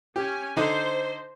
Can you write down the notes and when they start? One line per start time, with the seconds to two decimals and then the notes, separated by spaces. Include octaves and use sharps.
0.16 C#4 G4 G#5
0.57 D3 D#4 C5